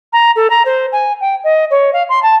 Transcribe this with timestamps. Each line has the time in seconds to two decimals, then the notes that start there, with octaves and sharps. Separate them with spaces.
0.13 A#5
0.36 A4
0.50 A#5
0.65 C5
0.92 G#5
1.21 G5
1.44 D#5
1.71 C#5
1.93 F5
2.09 C6
2.23 A5